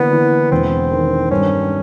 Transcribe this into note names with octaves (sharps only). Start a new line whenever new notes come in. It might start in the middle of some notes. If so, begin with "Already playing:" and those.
Already playing: D3 E3 A#3 B3
E3
E1 C4
D#3
G2 C#4